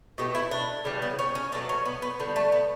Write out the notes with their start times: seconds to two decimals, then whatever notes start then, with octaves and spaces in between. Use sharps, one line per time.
0.18 B2 A3 G4
0.35 E4
0.51 D4
0.84 C#3 E3 G3 D4
1.02 B3
1.19 C#4
1.35 C#4
1.52 B2 F#3 A3 D4
1.69 C#4
1.85 B3
2.02 B3
2.20 D3 G3 B3
2.36 A3
2.52 B3